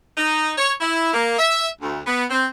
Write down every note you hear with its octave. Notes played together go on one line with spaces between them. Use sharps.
D#4
C#5
E4
A#3
E5
D2
B3
C4